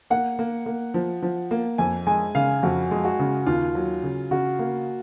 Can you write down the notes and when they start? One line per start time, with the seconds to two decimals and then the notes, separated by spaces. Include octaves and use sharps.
0.10 A#3 F#5
0.39 A#3
0.66 A#3
0.94 F3
1.22 F3
1.51 A#3
1.78 F2 G#5
2.07 G#3 G#5
2.35 C#3 F5
2.63 F2 F#4
2.91 G#3
3.04 F#4
3.19 C#3
3.46 D#2 F4
3.75 F#3
4.03 C#3
4.31 C#3 F#4
4.59 A#3